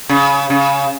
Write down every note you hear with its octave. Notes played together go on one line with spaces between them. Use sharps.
C#3
C#3